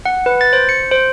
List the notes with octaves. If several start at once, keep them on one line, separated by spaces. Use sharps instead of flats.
F#5
B4
A6
C5
C#7
C5